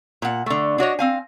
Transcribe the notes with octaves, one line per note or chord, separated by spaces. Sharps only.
A#2 F#5
D3 A3
D4 F#4 C#5 D#5
C4 F5 G#5